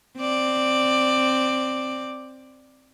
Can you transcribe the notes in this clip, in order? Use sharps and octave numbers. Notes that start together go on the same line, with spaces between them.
C4 D5